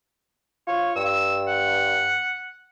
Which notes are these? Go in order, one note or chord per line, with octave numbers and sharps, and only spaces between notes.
F4 C#5
G2 E6
F#5